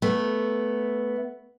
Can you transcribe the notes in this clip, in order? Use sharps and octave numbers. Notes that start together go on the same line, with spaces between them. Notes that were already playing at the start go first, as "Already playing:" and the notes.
A3 B3